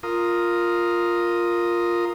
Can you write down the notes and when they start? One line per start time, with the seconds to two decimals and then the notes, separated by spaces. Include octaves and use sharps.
0.03 F4 A#4 D#6